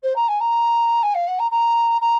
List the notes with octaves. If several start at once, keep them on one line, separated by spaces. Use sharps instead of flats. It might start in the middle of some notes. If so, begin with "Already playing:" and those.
C5
A#5
G#5
A#5
G#5
F5
F#5
A#5
A#5
A#5